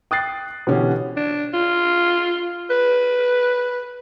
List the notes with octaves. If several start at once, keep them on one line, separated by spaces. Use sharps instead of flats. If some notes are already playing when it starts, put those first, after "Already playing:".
G5 D#6 F#6 A6 C7
B2 D3 E3 C#4 G4
D4
F4
B4